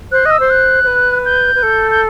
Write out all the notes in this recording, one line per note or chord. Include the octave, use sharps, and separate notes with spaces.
C5 F#6
D#5
E6
C5
F#6
C5
B4
G6
B4
A4
G6